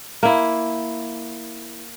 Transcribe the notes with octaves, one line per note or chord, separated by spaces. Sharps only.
A#3 E4